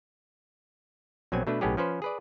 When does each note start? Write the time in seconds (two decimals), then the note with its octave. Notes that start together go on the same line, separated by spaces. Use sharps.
1.32 A#1 B2 F#3 C4 G#5
1.47 B2 A3 D4 B4
1.61 B1 A2 B3 C#4 G4 G#4
1.77 F3 C#4 B4 C5
2.02 G#4 B4 D5